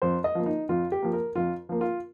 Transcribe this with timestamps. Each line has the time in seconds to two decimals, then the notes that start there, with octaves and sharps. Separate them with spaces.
0.02 F2 C5
0.24 D#5
0.35 F3 A#3
0.46 D#4
0.69 F2 F4
0.92 G4
1.02 F3 A#3
1.13 A#4
1.35 F2 F4
1.69 F3 A#3
1.81 F4